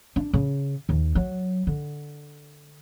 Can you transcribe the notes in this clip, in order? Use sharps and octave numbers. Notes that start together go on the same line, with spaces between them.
D4
C#3
D#2
F#3
D3